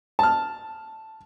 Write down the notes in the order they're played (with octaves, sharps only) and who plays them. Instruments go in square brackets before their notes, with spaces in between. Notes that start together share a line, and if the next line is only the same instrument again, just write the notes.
[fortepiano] A5 F6